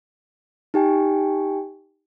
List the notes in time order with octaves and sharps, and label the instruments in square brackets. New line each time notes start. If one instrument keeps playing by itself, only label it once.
[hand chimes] D#4 G4 G5 G#5